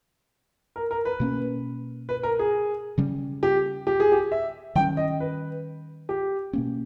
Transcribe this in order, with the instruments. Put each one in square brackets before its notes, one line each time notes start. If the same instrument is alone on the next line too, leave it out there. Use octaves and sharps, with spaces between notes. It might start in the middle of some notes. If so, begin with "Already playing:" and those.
[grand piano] A#4
A#4
B4
[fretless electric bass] B2 A#3 C#4
[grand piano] B4
A#4
G#4
[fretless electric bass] C#3 G3 C#4
[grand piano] G4
G4
G#4
G4
E5
[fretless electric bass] D#3 G3 C#4 [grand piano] G5
[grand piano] D#5
B4
G4
[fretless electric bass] B2 A#3 C#4